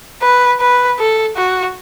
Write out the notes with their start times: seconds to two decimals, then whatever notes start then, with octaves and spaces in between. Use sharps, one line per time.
0.22 B4
0.60 B4
0.99 A4
1.36 F#4